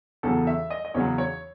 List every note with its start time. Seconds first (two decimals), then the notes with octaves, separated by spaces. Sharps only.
0.23 E2 C#3 F#3 A4
0.47 E5
0.70 D#5
0.85 D#5
0.94 E2 C#3 F#3 C#5
1.18 C#5